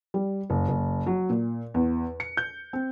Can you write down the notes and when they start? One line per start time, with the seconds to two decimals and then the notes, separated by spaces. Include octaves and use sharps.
0.14 G3
0.50 F#1
0.69 F#1
1.07 F#3
1.30 A#2
1.74 E2
2.20 C#7
2.37 G6
2.73 C4